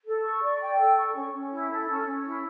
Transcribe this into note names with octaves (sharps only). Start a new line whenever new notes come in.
A4
C#6
D5
G5
A4
C#6
C#4
C#4
E4
A4
C#4
C#4
E4